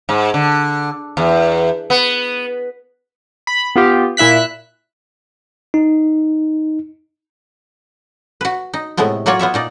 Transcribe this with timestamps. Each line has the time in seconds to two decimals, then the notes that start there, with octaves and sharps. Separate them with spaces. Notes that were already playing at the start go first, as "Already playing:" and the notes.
0.09 G#2
0.34 D3
1.17 E2
1.90 B3
3.47 B5
3.76 B3 F4 G4
4.17 A#2 E4 E5 F#6 B6
5.74 D#4
8.41 F#4 B4
8.74 D#4
8.97 A2 C3 G#3 A3 B3
9.26 F#3 A#3 F4 F#4 C#5 D5
9.39 B3 F4 C#5 E5
9.54 A#2 D#4 D5